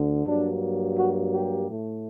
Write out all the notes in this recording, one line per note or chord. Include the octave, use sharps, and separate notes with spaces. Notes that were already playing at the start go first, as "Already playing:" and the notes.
Already playing: D2 D3
G2 F#3 A#3 D4
F#4
G4
A2 A3